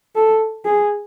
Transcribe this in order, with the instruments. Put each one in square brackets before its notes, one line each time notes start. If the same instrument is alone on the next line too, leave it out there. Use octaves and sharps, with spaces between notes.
[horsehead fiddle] A4
G#4